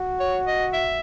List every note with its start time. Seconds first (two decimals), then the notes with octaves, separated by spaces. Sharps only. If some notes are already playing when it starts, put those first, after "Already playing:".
Already playing: F#4
0.20 C#5
0.47 D#5
0.74 E5